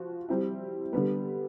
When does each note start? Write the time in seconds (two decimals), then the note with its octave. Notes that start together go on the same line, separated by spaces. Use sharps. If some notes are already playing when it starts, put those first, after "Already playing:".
Already playing: F3 F#4
0.29 G3 C4 E4
0.93 D3 G3 B3